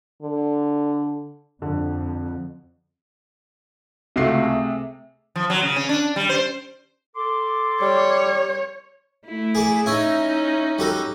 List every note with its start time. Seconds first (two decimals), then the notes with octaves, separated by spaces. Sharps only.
0.22 D3
1.62 F2 D3
4.16 C#2 C3 A3 F#4 C7
4.43 G#4
5.36 F3
5.50 F#3
5.63 C#3
5.76 C#4
5.89 D4
6.16 G3
6.29 C5
7.15 A4 C6 D6
7.82 G3 C#5
9.26 A3 E4
9.55 G#4 D5
9.86 C#4 D#4 E4 C#5
10.79 G3 F#4 A4